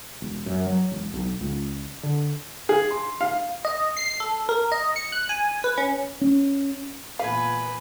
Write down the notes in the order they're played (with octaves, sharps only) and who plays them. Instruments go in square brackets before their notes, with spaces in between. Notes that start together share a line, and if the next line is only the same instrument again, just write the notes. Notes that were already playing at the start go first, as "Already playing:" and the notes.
[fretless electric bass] E1
F#2
F#3
E1
B1
C#2
D3
[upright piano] G#4
C6
F5
[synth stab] D#5
C7
A4
A#4
D#5
C#7
F#6
G#5
B4
C#4
[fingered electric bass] C#4
[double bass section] E2 A#2 [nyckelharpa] B4 [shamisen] F5 [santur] G#5 B5